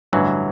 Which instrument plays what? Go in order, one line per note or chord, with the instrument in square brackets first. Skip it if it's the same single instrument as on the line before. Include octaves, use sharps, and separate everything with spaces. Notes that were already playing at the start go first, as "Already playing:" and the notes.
[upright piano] A1 G2 D3 [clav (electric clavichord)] E3 F#3